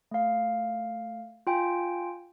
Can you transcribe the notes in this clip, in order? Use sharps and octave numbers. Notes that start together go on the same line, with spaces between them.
A3 F5
F4 G5 G#5